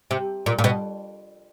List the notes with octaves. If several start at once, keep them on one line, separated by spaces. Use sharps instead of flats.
C3
A#2
A#2
B2